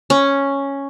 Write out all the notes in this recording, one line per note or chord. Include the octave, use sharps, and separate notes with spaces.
C#4